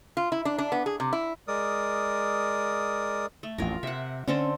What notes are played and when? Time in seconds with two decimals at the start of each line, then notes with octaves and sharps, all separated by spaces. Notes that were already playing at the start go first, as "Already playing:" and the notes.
0.17 F4
0.32 E4
0.45 D4
0.58 D4
0.72 B3
0.86 G#4
1.00 C3
1.13 E4
1.48 G#3 A#4 D5 D#6
3.43 A3
3.58 A1 F2 F4 A#4
3.83 C3 E5 F#5
4.28 D3 C4 C#4 A4